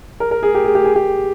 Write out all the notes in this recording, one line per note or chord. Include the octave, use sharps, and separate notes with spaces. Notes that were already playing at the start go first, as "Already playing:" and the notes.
A#4
A#4
G#4
G4
G#4
G4
G#4
G4